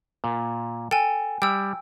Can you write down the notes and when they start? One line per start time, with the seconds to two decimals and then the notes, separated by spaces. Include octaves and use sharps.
0.24 A#2
0.91 A4 G5 G#5
1.42 G3 G5 E6